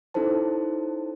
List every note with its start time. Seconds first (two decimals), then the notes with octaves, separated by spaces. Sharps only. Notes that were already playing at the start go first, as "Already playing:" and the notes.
0.14 C#4 D#4 E4 A4 C5 A5